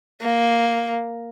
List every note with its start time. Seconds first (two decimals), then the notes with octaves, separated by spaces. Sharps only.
0.22 A#3